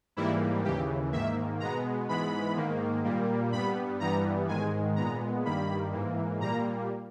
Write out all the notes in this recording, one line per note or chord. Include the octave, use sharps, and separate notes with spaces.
G#2 E3 G3 A#3 E4
D#2 C#3 E3 G4
G#2 D#3 A#3 E5
B2 G#3 B3 A#5
G#2 E3 G#3 B3 B5
G#2 D#3 A#3
A#2 G3 A#3
G2 G3 B3 B5
G2 E3 G3 B3 A#5
G#2 D#3 G#3 G#5
A#2 G#3 B3 A#5
G2 D#3 G3 A#3 B5
G#2 E3 A#3
A#2 G3 A#3 A#5